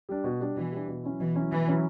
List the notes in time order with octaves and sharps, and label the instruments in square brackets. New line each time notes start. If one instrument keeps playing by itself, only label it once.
[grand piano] G3 D4
B2
G3 D4
[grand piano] B2 [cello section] E3
[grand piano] G3 D4
B2
F#3 C#4 E4
[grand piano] B2 [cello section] E3
[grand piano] F#3 C#4 E4
[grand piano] B2 [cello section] E3
[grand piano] F#3 C#4 E4